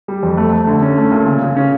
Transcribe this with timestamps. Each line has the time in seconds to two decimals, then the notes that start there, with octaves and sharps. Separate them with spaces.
0.08 G3
0.23 F2
0.37 A3
0.52 A3
0.67 D3
0.82 C#4
0.98 A3
1.12 A#2
1.26 C#3
1.42 C#3
1.56 C#4